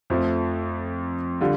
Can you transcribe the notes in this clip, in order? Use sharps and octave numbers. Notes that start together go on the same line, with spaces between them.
F2 F3 A3
D3 G3 F4